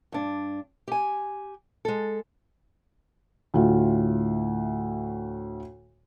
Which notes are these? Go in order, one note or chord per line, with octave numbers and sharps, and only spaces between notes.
G2 D4
G4 G#5
G#3 A4
D2 A2 F4